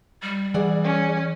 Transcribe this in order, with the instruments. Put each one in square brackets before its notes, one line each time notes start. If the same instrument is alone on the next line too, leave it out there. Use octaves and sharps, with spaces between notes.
[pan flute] G3
[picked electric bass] E3 [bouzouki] G#4 D5 F#5
[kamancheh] C#4